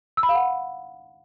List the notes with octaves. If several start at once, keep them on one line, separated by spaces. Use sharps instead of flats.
E6
B5
F5
F#5